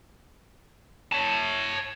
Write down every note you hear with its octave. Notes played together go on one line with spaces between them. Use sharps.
C#5 A5